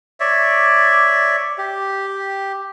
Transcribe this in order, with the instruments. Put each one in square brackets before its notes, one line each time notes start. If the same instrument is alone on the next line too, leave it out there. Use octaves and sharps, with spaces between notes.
[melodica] C#5 D5 E5
G4